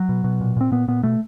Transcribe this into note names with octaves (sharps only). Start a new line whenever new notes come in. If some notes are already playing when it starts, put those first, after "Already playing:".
Already playing: F#3
B2
B2
A#2
A#2 C4
A#2 B3
A#2 B3
B2 A3